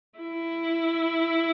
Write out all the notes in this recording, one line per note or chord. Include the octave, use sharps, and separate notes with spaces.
E4